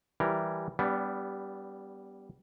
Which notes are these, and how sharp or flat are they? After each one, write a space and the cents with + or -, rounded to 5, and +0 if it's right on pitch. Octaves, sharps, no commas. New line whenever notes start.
E3 +0 G3 +0 A#4 +0
G3 +0 B3 +0 D4 -35